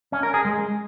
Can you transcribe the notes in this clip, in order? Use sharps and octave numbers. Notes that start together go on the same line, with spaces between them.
C#4
A#4
G#4
G#3